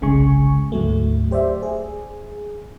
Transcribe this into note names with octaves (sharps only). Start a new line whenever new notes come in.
G1 C2 C#3 G#3 G#5 C#6
D2 G#2 F#3 A3
G4 C5 D5 E5
G#4